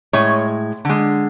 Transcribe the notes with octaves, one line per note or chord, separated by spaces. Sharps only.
A2 G#3 C#5
D3 G#3